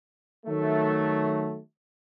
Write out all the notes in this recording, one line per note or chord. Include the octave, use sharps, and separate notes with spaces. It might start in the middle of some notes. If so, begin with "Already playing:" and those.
D#3 F#3 A3